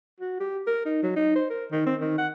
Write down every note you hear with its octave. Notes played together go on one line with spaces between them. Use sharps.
F#4
G4
A#4
D#4
F#3
D#4
C5
A#4
D#3
C4
D#3
F#5